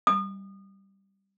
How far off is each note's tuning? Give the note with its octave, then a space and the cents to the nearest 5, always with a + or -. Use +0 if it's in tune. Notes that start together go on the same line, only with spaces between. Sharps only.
D#6 -35